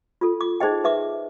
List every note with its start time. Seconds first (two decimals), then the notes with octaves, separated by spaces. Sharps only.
0.21 F4 A4
0.41 D6
0.60 D#4 G#4 C5 D#5 G5
0.84 B4 E5 D6